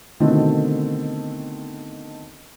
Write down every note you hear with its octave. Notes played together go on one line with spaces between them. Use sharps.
B2 D3 D#3 A3 C4